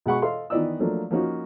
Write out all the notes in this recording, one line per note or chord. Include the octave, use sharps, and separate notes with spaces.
B2 G#3 G#4 F#5 B5 C#6
A4 D#5 F5 C6
D#3 E3 B3 D5 D#5 E6
F3 F#3 A3 A#3 D4
F3 A#3 C#4 D#4 F#4